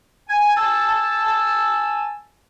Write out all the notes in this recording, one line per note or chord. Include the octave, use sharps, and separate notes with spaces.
G#5
G#5 A5 E6